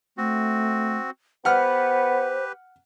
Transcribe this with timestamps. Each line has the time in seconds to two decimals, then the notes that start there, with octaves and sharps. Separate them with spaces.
0.18 A3 C4 F#4
1.45 B3 G4 B4 C5 F#5 F6